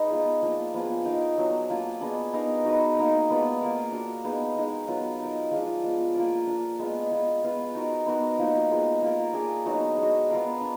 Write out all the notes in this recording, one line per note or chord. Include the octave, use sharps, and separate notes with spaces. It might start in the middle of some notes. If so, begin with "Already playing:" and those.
Already playing: G#3 D#4 B4
B3 F4 G#4
F3 A#3 D4
F3 B3 F4 G#4
D#4 A#4 D5 F5
F#3 B3 D4
A#3 D4 F4
B3 D4 G#4 D#5
B3 D#4 A#4 F5
D#4 F#4 B4 D5
A#3 D#4 A#4
G#3 B3 D4 F4
A#3 F4 A#4 F5
D4 F#4 A#4 F5
B3 D#4 G#4
G#3 D#4 A#4
F#3 B3 F4
D#4 A#4 D#5
F3 G#3 D4 F4
F3 G#3 B3
A#3 F4 A#4 D5
D4 F4 A#4
G#3 B3 F4
B3 F4 G#4
B3 F4 B4 F5
D#4 F#4 A#4
B3 D#4 F#4 A#4
F3 A#3 D#4 F#4
G#3 B3 F4
A#3 F4 A#4
D4 G#4 D5 F5
F#3 B3 D#4 F#4
G#3 D4 F#4
B3 F4 A#4 F5
D4